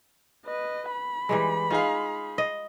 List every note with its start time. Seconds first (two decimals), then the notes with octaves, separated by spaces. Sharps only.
0.46 B4 D#5
0.91 B5
1.29 E3 G3 G#3
1.70 D#4 F4 G#4 F5
2.38 D#5